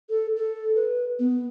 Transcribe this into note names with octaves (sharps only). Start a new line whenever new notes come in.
A4
A4
B4
B3